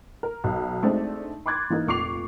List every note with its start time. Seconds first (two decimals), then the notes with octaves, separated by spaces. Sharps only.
0.23 A#4
0.44 B1
0.82 G#3 A3 C4 D4 D#4
1.46 B5 C6 D6 F#6 G#6 A6
1.70 E3 A#3 D#4 A#4
1.87 F1 A#2 C#6 D6 C7 F7